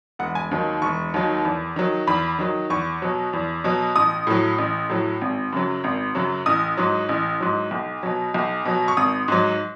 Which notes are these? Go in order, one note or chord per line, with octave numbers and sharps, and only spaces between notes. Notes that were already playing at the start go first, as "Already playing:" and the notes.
E1 F#5
G#5
D#2 D#3 F#3
E1 C#6
D#2 D#3 F#3
E2
D#3 F#3
E2 B5
D#3 F#3
E2 C#6
B2 F#3
E2
B2 F#3
A1 D#6
A2 F#3
A1
A2 F#3
G#1
F#2 C#3 F#3
G#1
F#2 C#3 F#3
A1 D#6
G#2 F#3
A1
G#2 F#3
B1
B2 F#3
B1
B2 F#3
C#6
G#1 D#6
G#2 F#3